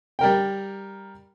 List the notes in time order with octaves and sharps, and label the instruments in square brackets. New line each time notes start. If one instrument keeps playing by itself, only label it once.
[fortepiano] G3 A#4 G5